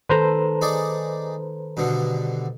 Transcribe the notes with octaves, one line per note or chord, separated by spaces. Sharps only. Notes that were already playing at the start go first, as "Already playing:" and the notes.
D#3 A4 B4 C5 A#5
D#4 G#4 D5
G2 B2 D3